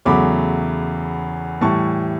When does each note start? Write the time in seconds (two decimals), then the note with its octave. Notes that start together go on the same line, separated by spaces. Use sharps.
0.05 E2 C#3 F#3 A3 B5 D6
1.61 A2 E3 G3 A5 C#6